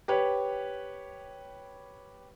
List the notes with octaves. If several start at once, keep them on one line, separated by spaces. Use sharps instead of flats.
G4 B4 C#5